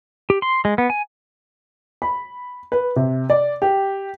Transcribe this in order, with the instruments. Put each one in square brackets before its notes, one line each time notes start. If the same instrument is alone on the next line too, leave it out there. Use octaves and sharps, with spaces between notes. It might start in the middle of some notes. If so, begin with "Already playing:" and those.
[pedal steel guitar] G4
C6
G#3
B3
G#5
[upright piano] B5
B4
C3
D5
G4